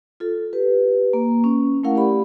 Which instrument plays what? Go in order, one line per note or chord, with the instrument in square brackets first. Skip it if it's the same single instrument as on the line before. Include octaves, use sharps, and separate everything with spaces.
[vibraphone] F4 A4
G4 B4
A#3
C#4
A3 C#4 E4 A#4 F5 F#5
G4 D5 B5